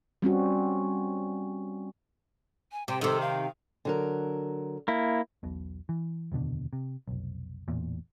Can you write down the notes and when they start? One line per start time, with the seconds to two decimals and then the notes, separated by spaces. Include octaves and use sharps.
0.22 G3 C4 C#4 F#4
2.72 G#5
2.88 C3 G5
3.01 C3 D#3 A4
3.21 F5
3.85 D3 F#3 A#4
4.88 A#3 E4
5.43 E1 B1 B2
5.89 E3
6.32 F1 D#2 B2 D3
6.73 C3
7.08 F1 B1
7.68 A1 E2 A#2